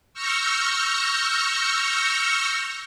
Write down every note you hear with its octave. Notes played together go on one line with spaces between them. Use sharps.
C#6 E6 F6 G6 A#6 C#7